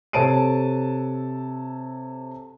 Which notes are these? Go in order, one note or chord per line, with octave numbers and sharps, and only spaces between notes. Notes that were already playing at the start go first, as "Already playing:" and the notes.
C3 A4 C#5 A5 D7 D#7